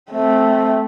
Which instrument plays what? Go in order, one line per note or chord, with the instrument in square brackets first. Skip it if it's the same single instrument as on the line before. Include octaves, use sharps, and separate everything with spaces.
[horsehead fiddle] A3 C4